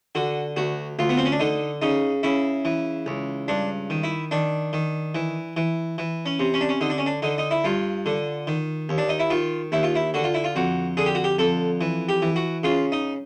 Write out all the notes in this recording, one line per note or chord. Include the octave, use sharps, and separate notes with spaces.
D3 F#4
D2 F#4
D2 F4
B3
C4
C#4
D4
D3 D#4
C#3 D#4
C#3 E4
E3
C#2
G2 D4
D#3
E4
D#3 D4
D#3
E3
E3
E3
C#4
C3
C#4
D4
C#4
D3 D#4
D4
C#4
D4
D3 D#4
D#4
E4
G2 F4
D3
D#3
D#2
D4
D#4
E4
D#3 F4
D#2 E4
F4
E4
D3 F#4
F4
E4
F4
F2 F#4
D3 G#4
G4
F#4
G4
F2 A4
E3
G4
E3
F#4
C#3 F4
D#4